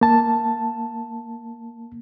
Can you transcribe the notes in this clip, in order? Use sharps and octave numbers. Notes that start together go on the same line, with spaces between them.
A#3 A5